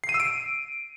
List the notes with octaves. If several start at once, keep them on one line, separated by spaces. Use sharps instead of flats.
C7
D#7
E6
D7